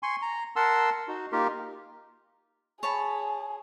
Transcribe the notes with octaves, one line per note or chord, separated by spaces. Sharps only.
G#5 C6 C#6
A#5
A#4 F#5 A5 C6 E6
D#4 F#4
A#3 D#4 F4 G4 A#4
G#4 C#5 A5 B5